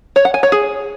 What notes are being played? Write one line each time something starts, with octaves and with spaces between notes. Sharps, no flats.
C#5
F#5
G#5
C#5
G#4